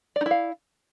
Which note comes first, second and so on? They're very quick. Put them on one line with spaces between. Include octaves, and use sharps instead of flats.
D5 D#4 E4 F5